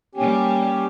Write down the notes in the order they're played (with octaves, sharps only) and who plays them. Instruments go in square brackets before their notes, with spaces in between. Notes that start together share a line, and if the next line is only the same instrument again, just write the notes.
[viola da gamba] G3 A#3 [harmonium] C#4 G4